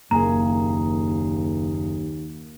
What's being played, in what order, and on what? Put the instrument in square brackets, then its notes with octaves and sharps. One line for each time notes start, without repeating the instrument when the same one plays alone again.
[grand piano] F#1 G#4 G#5 [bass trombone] D#2 [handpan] A#3 [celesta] A#5